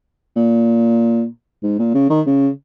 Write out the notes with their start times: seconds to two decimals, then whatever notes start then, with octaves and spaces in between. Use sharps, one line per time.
0.36 A#2
1.63 G#2
1.79 A#2
1.94 C#3
2.10 D#3
2.26 C#3